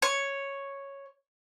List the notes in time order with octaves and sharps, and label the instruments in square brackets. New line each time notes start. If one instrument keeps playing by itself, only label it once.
[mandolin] C#5